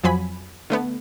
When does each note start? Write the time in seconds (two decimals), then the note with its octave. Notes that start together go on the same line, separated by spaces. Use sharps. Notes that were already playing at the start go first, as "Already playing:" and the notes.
0.03 F2 F3 F#3 G#5 B5
0.70 D3 A3 B3